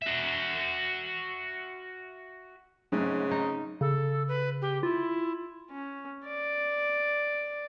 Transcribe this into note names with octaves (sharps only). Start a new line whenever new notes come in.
F#4 E5
G#2 C#3 F#3 A3 C4
D#4
C#3 A4
B4
G4
E4 F4
C#4
D5